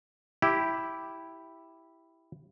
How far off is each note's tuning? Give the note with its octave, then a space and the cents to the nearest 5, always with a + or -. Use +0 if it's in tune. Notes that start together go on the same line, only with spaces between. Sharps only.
E4 +0 G4 +0